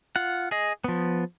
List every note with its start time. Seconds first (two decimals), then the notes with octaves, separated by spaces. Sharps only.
0.16 F4 F#5
0.51 G#4 D#5
0.84 F3 B3